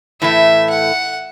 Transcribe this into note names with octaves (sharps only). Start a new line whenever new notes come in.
A2 E3 A3 E5
F#5